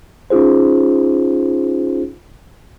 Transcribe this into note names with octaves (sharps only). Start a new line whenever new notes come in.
C#4 D#4 F4 G#4 C5